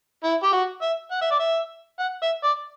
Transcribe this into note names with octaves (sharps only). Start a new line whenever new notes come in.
E4
G4
F#4
E5
F#5
E5
D5
E5
F#5
E5
D5